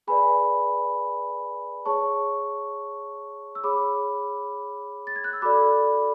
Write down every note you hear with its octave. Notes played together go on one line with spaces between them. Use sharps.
G#4 B4 D5 G#5 B5
G#4 C#5 A5 C#6
E6
G#4 C#5 B5 D6
A6
G#6
F#6
E6
F#4 A4 D5 B5 D6